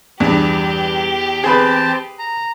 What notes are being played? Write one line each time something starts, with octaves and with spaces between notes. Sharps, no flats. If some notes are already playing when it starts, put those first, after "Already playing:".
E2 G2 G4
C4 G#4 B4 A5
A#5